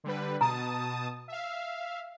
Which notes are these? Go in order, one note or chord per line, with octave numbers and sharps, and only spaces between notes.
D3 G3 B4
B2 A5 A#5 D#6
E5 F5